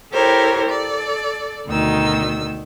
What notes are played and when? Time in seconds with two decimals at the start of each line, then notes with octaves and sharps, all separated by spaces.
0.13 E4 G4 A4 A#4 C5 C#5
0.67 A4 D5
1.66 D2 B2 D#3 E6